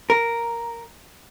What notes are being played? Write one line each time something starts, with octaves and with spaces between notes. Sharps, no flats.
A#4